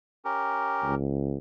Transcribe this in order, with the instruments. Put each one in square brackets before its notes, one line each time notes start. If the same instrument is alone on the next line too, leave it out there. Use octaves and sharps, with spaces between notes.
[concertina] C#4 G4 A#4
[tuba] C#2